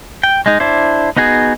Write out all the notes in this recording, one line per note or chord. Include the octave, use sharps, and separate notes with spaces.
G5
G#3 D#4
D4 E4 C5
B3 D#4 F#4 G#4